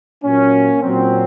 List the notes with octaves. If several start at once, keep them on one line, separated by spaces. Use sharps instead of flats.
A#2 F#3 A#3 C#4
A#2 F#3 C4